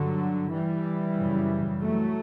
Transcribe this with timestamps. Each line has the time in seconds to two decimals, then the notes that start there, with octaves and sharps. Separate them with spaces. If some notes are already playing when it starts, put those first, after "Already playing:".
Already playing: G2 D3 F#3
0.51 E3 G3
1.17 F#2 C#3
1.81 F#3 A3